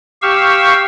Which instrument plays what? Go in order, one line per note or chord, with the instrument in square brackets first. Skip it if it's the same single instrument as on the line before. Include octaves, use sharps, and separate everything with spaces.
[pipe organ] G4 F5 C#6 E6